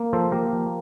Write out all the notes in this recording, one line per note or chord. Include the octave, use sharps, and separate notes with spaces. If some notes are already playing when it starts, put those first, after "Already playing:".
Already playing: A#3
F3 A4 C5
A#3 G4 A#4
F3